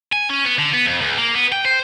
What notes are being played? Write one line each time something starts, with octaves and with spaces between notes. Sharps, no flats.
G#5
C#4
B3
D3
B3
F2
C#2
A#3
B3
G5
C5